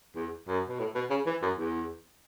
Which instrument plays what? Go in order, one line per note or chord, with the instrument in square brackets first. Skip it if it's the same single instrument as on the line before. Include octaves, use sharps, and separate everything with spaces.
[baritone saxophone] E2
F#2
B2
A2
B2
C#3
E3
F#2
E2